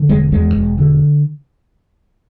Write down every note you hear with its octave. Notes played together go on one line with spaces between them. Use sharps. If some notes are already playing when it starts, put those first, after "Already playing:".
Already playing: D3
E1 G#3
E2 G#3
E1
D3